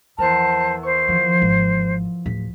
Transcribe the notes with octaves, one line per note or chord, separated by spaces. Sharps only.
E2 F3 B3 A#4 C5 A5
C5 C#6
D#3 F3
G#1
D1 B6